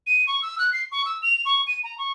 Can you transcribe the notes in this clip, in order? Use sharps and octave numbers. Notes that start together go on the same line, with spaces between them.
D#7
C#6
E6
F#6
C7
C#6
E6
F7
C#6
D#7
A#5
C#6